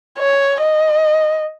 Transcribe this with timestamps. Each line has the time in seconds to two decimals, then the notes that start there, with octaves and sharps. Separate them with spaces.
0.19 C#5
0.61 D#5